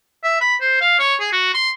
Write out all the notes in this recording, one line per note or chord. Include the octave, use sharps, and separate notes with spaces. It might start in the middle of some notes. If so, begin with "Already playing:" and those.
E5
B5
C5
F5
C#5
G#4
F#4
C6